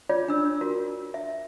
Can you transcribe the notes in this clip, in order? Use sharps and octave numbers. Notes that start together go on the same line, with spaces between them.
F4 G#4 C#5 D5
D4 E6
F4 F#4 A#4
E5